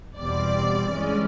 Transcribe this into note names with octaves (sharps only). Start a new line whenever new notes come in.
E2 B2 G3 C4 D5
G2 E3 G#3 C#4